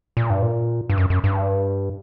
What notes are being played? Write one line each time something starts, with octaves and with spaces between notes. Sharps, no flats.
A#2
G2
A#2
G2
F#2
F#2
G2